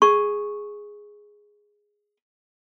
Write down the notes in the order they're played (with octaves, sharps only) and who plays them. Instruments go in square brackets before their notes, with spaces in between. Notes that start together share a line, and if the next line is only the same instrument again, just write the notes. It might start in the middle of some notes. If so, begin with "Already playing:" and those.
[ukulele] G#4 [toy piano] C#6